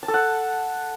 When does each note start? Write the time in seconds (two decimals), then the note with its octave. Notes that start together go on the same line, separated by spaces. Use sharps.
0.03 A5
0.08 A4
0.14 F#5